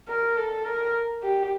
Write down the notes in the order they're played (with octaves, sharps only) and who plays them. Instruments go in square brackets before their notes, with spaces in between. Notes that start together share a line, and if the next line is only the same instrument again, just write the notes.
[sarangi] A#4
A4
A#4
G4